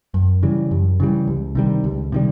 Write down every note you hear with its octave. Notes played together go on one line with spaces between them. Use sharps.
F#2
C#3 E3 G3
F#2
C#3 E3 G3
C#2
C3 D#3 G3
C#2
C3 D#3 G3